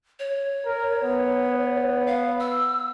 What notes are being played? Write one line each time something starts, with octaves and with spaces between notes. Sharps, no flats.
C#5
A#4
B3
F5
E6